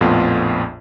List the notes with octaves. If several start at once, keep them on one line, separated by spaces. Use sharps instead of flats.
A#1 F2 A2 B3 F4